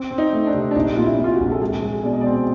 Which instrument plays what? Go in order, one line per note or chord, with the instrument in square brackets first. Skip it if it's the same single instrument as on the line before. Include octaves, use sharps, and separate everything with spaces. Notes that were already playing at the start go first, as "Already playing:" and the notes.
Already playing: [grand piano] C4
C4
[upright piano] D#4
[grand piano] A3
[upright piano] D4
[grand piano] C3
[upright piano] D4
[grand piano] A#1 [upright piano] D#4
[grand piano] A#2 [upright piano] F4
[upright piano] E4
[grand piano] A#2
[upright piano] F4
F#4
[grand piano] A#1
[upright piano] A4
[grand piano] G#3 [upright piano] G#4
[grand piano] G#3
[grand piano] B2 [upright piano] D5
[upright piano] D#5
[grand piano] C4 [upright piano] D5